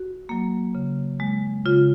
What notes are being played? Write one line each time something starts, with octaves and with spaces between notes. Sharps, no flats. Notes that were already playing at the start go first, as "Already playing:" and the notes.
Already playing: F#4
F#3 A#3
C#3
G#3
C#3 F4